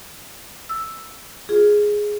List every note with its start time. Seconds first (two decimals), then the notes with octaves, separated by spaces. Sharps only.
0.69 E6
1.49 F4 G#4